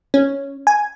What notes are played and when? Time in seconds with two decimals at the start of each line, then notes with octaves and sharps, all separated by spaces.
0.14 C#4
0.67 G#5